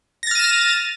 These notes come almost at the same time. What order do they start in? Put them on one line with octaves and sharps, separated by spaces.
A#6 A6 F6 D#7 E7